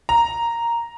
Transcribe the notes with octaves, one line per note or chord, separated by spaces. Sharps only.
A#5